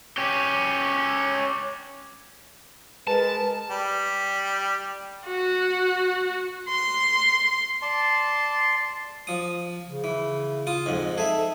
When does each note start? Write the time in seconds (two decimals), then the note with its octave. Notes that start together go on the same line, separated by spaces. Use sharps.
0.18 C#4 G4
3.07 G#3 A#4 B4 A5
3.71 G3
5.26 F#4
6.69 C6
7.82 D5 A5 C6
9.27 F3 D#6
9.87 C#3
10.04 E3
10.67 F4 D#6
10.86 F2 G#2
11.18 G#4 A4 E5